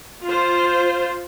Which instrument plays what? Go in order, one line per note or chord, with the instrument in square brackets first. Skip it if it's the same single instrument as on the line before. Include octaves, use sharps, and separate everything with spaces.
[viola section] F4 C5